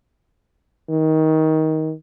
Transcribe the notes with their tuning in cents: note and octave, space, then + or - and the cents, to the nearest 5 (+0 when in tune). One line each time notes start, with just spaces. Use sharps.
D#3 +20